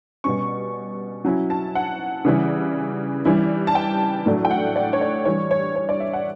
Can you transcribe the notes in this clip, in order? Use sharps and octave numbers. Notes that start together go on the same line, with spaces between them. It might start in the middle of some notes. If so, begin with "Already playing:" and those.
B2 G3 C#4 C#6
F#3 C#4 E4
A5
F#5
C#3 E3 G3 C#4 E4
E3 G3 C#4 E4
A5
G5
A2 F#3 A3 D4
G5
F#5
D5
C#5
D5
E3 G3 D4 C#5
C#5
C#5
D5
E5
F#5